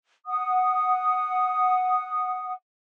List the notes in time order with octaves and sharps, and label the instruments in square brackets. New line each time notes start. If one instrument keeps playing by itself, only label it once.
[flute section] F#5 D#6